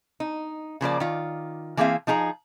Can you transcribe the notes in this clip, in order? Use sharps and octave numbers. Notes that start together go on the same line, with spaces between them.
D#4
C#3 F3 A#3 D5
D#3 F4
E3 A#3 C4 G#4 E5 F5
F3 D#4 G#4 A#5